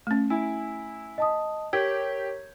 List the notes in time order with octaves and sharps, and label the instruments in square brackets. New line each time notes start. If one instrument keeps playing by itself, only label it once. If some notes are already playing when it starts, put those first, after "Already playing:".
[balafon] A3 C#4
[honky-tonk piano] E4 [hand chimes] G#5
[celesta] D#5 A5 D#6
[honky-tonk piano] G4 [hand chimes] A#4 C#5 [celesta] G#6